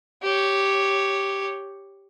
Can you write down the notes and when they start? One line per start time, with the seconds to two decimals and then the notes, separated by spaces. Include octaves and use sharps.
0.23 G4 C#5